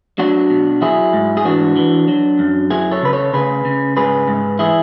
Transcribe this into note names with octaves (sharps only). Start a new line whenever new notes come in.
F#3 D4 F#4
B2
F#3 E4 G#4
G#2
G#4
E3 D4 F#4
E3
F#3
F#2
F#3 E4 G#4
A4 C#5
C#3 B4
A4 C#5
C#3 G#4 B4
C#3
G#2 G#4 B4
G#2
E3 E4 G#4